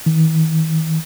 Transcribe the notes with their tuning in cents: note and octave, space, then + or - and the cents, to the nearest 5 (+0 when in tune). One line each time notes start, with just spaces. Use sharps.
D#3 +45